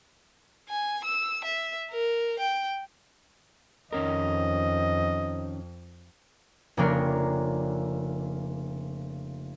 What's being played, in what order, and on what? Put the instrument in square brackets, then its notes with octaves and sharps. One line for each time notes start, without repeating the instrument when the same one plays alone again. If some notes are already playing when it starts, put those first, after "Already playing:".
[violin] G#5
E6
E5
A#4
G5
[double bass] F2 [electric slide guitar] D#3 C#4 A#4 [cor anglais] D#5
[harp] F1 C#3 A#3 D4 A#4 C#5